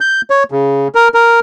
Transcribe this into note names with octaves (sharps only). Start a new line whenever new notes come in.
G6
C#5
C#3
A#4
A#4